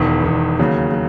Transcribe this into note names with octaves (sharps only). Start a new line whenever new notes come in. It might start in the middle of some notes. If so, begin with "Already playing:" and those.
Already playing: E1 E2 D#3
E1 E2 D#3
D#2 C#3 F#3
F#3